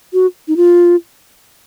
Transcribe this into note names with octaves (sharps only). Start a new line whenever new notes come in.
F#4
D#4
F4